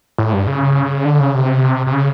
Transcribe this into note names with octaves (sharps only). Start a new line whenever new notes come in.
A2
G2
C#3
D3
C#3
C3
C3
C#3